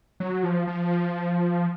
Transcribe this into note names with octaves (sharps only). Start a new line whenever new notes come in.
F#3
F3
F3